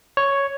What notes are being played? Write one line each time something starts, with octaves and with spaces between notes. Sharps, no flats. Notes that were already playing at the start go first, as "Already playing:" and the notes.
C#5